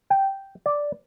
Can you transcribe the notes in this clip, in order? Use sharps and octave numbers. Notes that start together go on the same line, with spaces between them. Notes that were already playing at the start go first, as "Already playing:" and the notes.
G5
D5